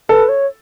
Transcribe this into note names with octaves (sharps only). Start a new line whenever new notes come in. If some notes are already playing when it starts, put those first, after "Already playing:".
A4 B4
C#5